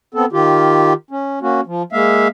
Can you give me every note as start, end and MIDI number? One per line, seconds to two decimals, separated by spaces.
0.14 0.25 59
0.14 0.25 60
0.14 0.25 69
0.32 0.93 51
0.32 0.93 65
0.32 0.93 67
1.11 1.39 61
1.42 1.61 58
1.42 1.61 61
1.42 1.61 66
1.66 1.82 53
1.92 2.28 56
1.92 2.28 58
1.92 2.28 76
1.92 2.28 77